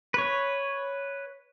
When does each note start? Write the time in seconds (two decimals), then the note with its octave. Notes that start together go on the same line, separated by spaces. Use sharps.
0.14 B4 C#5